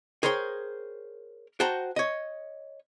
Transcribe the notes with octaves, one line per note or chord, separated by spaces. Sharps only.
G#4 A#4 C5 C#5 G5
F#4 C5 F#5 G5 A5 A#5
C#5 D#5